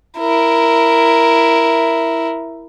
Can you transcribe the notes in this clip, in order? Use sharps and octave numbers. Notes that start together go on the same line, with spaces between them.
E4 A#4